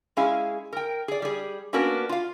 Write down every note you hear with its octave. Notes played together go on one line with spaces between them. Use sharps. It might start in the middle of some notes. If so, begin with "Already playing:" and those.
G#3 C#4 E4 G#4 F5
A#4 G5
G#4 D5
G3 G#4
A#3 B3 C#4 D4 F#4 A#4
F4 F5